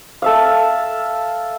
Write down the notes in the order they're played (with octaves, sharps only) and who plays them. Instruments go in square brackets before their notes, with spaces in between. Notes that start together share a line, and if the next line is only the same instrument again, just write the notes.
[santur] A4 E5 F5